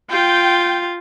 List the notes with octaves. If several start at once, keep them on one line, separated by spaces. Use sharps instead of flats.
F4 G5